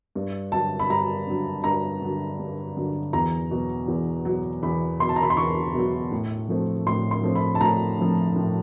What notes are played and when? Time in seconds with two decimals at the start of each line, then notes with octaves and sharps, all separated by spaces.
0.15 G2
0.52 D3 F#3 A5
0.79 B5
0.90 G2 A#5
1.27 D3 F#3
1.64 G2 A#5
2.02 D3 F#3
2.39 G2
2.76 D3 F#3
3.13 E2 A#5
3.51 B2 F#3
3.88 E2
4.25 B2 F#3
4.63 E2 B5
5.00 B2 F#3 C6
5.09 A5
5.16 A#5
5.23 B5
5.30 C6
5.37 E2 C#6
5.74 B2 F#3
6.12 A2
6.49 F3 A3 C4
6.86 A2 C6
7.11 C6
7.23 F3 A3 C4
7.35 B5
7.55 A5
7.61 A2 A#5
7.98 F3 A3 C4
8.36 A2